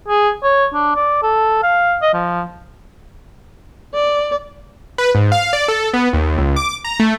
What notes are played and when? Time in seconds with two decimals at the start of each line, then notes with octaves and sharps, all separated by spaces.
0.08 G#4
0.43 C#5
0.74 D4
0.95 D5
1.23 A4
1.63 F5
2.02 D#5
2.13 F3
3.95 D5
4.98 B4
5.15 G#2
5.32 F5
5.53 D5
5.68 A4
5.93 B3
6.13 D#2
6.38 C#2
6.56 D6
6.84 A#5
7.00 A3